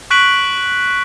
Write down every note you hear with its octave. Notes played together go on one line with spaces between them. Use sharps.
C#6 F#6 B6 D7 F#7